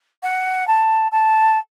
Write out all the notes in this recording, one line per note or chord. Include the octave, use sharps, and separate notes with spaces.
F#5
A5
A5